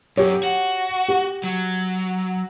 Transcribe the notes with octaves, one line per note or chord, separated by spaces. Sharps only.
F#2 G4 C#5
F#4
G4
F#3